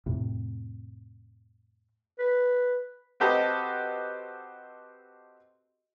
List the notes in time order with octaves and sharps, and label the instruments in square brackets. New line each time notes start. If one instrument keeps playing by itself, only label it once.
[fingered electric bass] F2 A2 C3
[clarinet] B4
[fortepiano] C4 F#4 G4 A4 B4 D#5